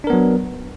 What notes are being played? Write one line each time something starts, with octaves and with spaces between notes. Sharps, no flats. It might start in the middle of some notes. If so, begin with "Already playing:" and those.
F#3 B3 D4 A#4